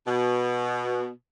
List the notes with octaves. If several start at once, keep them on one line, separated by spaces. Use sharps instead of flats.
B2